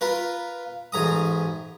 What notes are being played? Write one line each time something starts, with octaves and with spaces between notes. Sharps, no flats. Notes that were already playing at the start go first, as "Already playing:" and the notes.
F4 A#4 B4
A1 G#2 A#5 D#6